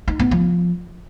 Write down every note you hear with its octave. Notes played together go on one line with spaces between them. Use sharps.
D#4
B3
F3